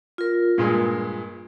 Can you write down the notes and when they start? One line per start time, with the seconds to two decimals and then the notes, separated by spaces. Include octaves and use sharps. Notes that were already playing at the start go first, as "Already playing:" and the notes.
0.18 F4 A#4
0.58 G2 A#2 G#3